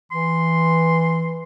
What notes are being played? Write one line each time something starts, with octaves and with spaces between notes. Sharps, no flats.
E3 C6